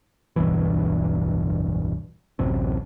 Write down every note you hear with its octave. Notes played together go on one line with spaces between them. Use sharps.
D1 B1 G2 E3
D1 A1 F#2 C3